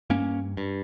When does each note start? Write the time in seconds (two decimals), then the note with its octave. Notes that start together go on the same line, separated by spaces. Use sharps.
0.10 G2 A#3 C#4
0.57 G2